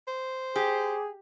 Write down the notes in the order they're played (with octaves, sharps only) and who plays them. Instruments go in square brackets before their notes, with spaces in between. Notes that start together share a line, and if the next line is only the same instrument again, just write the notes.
[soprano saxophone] C5
[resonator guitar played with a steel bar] G4 [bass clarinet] G#4